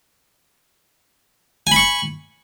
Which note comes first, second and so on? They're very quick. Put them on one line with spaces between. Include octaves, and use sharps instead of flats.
G#5 B5 C#6